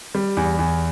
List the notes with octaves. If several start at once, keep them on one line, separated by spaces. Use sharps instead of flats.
G3
E2
E2